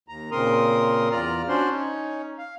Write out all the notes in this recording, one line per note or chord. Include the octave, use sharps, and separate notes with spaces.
D#2 A#5
A#2 C#3 C4 A#4 C6 D#6
E2 F4 D5 A#5 F6
C#4 D4 F#4 C5 D5 C6
C#4 D#4 C#5
F5